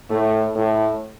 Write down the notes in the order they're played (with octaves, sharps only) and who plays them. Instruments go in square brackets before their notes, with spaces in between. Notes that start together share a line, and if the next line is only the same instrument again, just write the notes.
[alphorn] A2 [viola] A3
[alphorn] A2